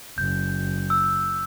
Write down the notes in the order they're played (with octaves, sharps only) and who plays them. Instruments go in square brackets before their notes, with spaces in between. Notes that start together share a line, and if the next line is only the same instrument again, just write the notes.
[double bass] F#1 [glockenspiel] G6
[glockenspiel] E6